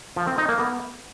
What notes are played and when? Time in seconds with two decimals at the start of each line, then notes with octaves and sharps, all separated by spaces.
0.16 F3
0.27 C4
0.38 D#4
0.49 A#3
0.59 B3